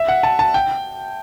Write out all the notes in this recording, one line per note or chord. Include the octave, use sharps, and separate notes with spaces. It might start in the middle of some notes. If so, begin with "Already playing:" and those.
Already playing: E5
F#5
A5
A5
G5